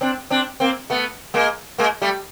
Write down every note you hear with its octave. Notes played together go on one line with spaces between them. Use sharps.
C4 D4
C4 D4
A#3 C4
A3 B3
G#3 A#3
G#3 A#3
G3 A3